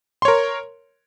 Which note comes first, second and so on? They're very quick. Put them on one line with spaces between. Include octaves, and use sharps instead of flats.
C6 C#5 A#4